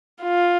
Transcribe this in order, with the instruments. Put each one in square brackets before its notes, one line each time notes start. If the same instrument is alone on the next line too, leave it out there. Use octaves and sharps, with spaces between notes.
[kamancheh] F4